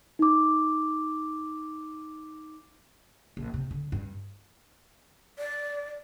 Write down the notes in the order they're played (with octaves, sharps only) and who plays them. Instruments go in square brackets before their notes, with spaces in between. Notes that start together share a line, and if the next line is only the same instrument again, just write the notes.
[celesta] D#4 D6
[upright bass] A#1
C3
D3
G2
[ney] D5